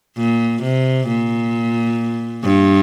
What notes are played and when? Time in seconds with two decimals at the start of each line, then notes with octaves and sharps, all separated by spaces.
0.18 A#2
0.63 C3
1.08 A#2
2.44 G2